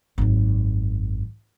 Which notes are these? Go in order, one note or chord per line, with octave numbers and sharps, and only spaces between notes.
G#1 F#2